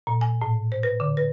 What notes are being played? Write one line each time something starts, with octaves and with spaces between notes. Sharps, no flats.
A#2
G#5
A2
C5
B4
D3
B4